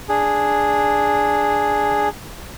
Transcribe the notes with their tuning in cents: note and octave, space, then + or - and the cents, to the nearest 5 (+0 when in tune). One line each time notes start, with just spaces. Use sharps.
D4 +0 G#4 +0